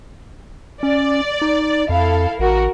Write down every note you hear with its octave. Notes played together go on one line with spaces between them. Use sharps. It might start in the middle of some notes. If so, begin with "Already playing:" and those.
C#4 D5
D#4
F2 E4 A4 F5
A1 F#4 A#4